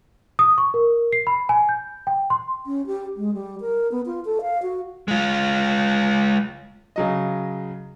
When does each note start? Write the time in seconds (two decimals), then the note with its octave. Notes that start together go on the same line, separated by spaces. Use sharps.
0.39 D#6
0.58 C#6
0.74 A#4
1.13 C7
1.27 B5
1.49 G#5
1.69 G6
2.07 G5
2.30 C6
2.66 C#4
2.86 G4
3.17 G#3
3.34 G3
3.61 A#4
3.92 B3
4.06 F4
4.25 A4
4.42 F5
4.62 F#4
5.08 G#3 F4
6.96 C#3 F#3 D#5